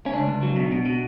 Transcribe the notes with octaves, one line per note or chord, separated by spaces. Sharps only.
C#4
C#2 D4
C#2
F#3
B2
B2
B2